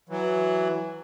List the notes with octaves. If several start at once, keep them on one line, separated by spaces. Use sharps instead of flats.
E3 F#3